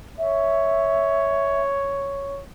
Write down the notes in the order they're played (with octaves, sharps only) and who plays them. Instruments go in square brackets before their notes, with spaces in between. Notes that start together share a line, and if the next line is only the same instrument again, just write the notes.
[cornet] C#5 [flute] E5